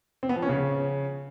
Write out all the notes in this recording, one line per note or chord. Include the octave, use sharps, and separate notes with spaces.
C4
B3
F3
C#4
C#3